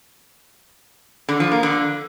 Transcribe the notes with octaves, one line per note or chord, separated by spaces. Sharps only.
D3
F3
A#3
D3